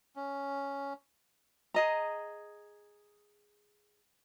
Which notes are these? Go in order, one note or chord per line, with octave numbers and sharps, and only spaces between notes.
C#4
G#4 D#5 A#5